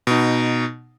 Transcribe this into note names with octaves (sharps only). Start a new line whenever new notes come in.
B2 D#4